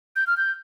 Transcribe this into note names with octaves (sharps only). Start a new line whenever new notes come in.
G6
F6
G6